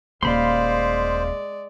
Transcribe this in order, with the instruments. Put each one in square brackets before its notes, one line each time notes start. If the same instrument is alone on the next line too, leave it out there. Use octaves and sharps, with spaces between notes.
[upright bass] D#1 [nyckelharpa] G#3 D5 [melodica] C5 [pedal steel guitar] F5 B5 C6